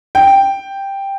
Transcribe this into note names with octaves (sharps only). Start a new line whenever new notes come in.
G5